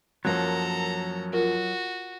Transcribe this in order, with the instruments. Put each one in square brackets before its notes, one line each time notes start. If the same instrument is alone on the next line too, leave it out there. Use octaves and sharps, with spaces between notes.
[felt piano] F#2 F3 A#3 [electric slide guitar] F#3 [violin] A4 A#5
[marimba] F4 A#4 [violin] F#4